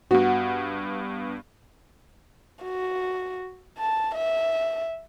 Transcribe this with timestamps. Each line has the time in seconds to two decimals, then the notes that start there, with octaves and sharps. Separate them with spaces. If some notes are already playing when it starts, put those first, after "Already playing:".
0.11 G2 B3 F#4
2.64 F#4
3.78 A5
4.16 E5